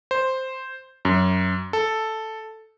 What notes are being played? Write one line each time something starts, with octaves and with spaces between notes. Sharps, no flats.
C5
F#2
A4